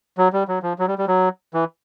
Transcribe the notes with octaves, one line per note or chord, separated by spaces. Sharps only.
F#3
G3
F#3
F3
F#3
G3
G3
F#3
E3